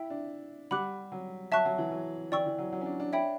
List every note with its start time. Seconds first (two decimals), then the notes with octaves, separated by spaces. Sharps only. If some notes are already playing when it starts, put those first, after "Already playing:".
Already playing: E4 E5 G5
0.10 D4
0.71 G3 F#5 B5 D6 F#6
1.12 F#3
1.51 F#3 E5 A5 C#6 F#6
1.65 F#3
1.78 E3
1.92 F#3
2.32 E3 D5 G5 C#6 E6
2.46 E3
2.58 F#3
2.72 F#3
2.81 C#4
2.86 D4
3.00 D4
3.13 C#5 E5 G5 B5